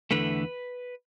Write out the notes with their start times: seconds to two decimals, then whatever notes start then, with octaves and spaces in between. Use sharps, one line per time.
0.11 E2 D3 A3 B4